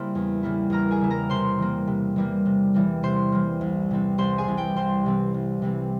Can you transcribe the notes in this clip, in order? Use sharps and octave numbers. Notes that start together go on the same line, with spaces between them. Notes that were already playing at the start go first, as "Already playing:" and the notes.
Already playing: C#3 G3 A#3 E4 A#4 C5 C6
E2
C#3 G3 A#3 E4
E2 A#4 A#5
G#4 G#5
C#3 G3 A#3 E4
A#4 A#5
C3 C5 C6
E3 G3 A#3
C3
E3 G3 A#3
C3
E3 G3 A#3
C3 C5 C6
E3 G3 A#3
C2
C3 E3 G3 C4
C2 C5 C6
G#4 G#5
C3 E3 G3 C4
G4 G5
C2 C5 C6
C3 E3 G3 C4
C2
C3 E3 G3 C4